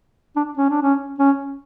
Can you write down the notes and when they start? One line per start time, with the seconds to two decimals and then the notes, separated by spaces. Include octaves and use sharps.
0.36 D4
0.58 C#4
0.70 D4
0.82 C#4
1.19 C#4